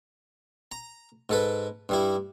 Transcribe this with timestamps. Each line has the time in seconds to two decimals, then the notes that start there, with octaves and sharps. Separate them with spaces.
0.72 A#5
1.29 G#2 A4 B4
1.89 G2 G3 E4